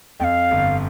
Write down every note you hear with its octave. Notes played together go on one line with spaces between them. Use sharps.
F2 F5 G5
G1